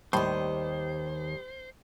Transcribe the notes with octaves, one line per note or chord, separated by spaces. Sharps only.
D#2 A2 D#3 G3 C5 D#5